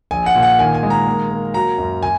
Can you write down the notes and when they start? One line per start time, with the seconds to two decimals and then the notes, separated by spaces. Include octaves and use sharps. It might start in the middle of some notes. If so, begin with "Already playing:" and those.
0.11 A#1 G#5
0.26 F#5
0.35 A#2
0.43 F#5
0.59 D#3 G#5
0.75 G#5
0.83 G#3
0.90 A#5
1.07 A#3
1.31 A#3
1.54 F#3 A#5
1.78 F#2
2.03 G#5